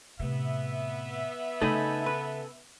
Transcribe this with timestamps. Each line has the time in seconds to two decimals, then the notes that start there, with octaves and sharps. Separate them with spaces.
0.19 A2 C3 B3 E5
1.62 C#3 A3 D#4 A4 D#5 G#5 B5
2.06 B4